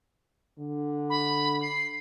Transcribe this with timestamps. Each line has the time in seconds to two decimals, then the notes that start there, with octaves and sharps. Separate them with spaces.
0.59 D3
1.10 B5
1.62 C7